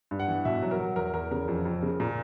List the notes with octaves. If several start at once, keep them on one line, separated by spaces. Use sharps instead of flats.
G2
F#5
E3
B2 E5
F#3
A#4
F#3
E2 A#4
E2 A#4
C#3 A#4
F2
F2
C#3
A#2